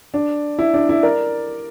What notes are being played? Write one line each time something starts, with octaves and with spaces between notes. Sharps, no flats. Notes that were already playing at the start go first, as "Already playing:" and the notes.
D4
E4
D4
E4
A#4 D5